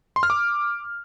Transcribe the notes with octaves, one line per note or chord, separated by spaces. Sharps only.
C6
F6
D6